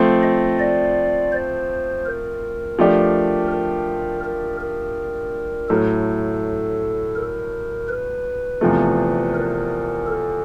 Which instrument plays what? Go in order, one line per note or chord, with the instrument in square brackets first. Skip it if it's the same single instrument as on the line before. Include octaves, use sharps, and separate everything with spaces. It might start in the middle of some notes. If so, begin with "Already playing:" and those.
Already playing: [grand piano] F3 A3 C4
[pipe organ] D#5
D5
C5
A#4
[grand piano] F3 A3 D4 G4
[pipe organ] A#4
A#4
A#4
[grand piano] A2 F#3 A3 [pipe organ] A4
[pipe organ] A#4
B4
[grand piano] E2 C3 F3 A3
[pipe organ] A#4
A4